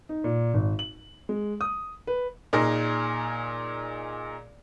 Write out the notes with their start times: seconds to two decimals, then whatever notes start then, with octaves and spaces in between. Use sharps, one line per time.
0.09 D#4
0.24 A#2
0.54 G#1
0.79 F#7
1.29 G#3
1.61 D#6
2.07 B4
2.53 A#2 D#4 G#4 A#4